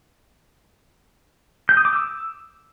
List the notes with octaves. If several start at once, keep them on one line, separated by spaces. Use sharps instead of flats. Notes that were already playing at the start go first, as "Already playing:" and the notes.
G6
D#6
D6
E6